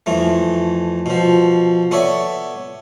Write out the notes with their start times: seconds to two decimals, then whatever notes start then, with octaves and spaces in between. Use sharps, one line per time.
0.06 F2 E3 A3
1.06 B2 F3
1.91 B3 A4 C#5 D5 E5